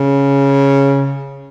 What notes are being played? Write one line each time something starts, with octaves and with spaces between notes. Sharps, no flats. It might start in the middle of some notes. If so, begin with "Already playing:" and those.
Already playing: C#3